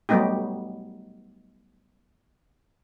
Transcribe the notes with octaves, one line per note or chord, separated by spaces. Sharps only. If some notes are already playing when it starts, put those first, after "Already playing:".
F#3 G3 A3 B3 D#4 G4